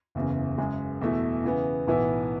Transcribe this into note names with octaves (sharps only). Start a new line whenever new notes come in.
F#1 E2 C#3
F#2 C#3 G#3
E2 B2 A3 E4
C#3 E3 B3
B1 A2 E3 B3 E4